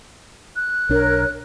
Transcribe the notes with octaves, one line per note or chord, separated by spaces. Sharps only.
F#6
B1 D4 A#4 C#5